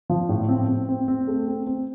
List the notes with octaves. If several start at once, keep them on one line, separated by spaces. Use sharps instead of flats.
F3
A2
C4
C4
C4
C4
A3
C4
C4